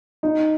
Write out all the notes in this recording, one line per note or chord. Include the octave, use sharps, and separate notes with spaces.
D#4